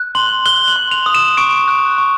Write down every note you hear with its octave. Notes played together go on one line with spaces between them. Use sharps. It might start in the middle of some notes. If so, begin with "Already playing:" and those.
Already playing: F#6
C6 F#7
F#6 G7
F#7
C6
F7
D#6
E7
C#6 D7
F#6
C#6